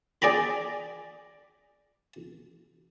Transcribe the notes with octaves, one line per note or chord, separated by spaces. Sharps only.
G#4 D5 G5 A#5 B5